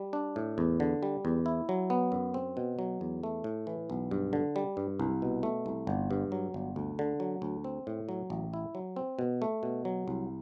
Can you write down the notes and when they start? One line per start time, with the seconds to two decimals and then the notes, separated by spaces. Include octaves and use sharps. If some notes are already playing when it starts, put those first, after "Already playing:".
Already playing: G3
0.13 D4
0.36 A2
0.58 E2
0.80 D3
1.03 G3
1.25 E2
1.46 E4
1.69 F#3
1.90 B3
2.12 F#2
2.34 C4
2.57 B2
2.79 F#3
3.01 E2
3.23 A3
3.44 A2
3.67 E3
3.90 B1
4.11 G2
4.33 D3
4.56 G3
4.77 G2
5.00 C2
5.22 B2
5.43 A3
5.66 C2
5.87 G1
6.11 G2
6.32 F#3
6.54 G1
6.76 D2
6.99 D3
7.20 F#3
7.42 D2
7.64 C4
7.87 A2
8.09 F#3
8.30 A1
8.53 E4
8.75 F#3
8.96 C4
9.19 B2
9.42 A3
9.63 B2
9.85 F#3
10.08 C2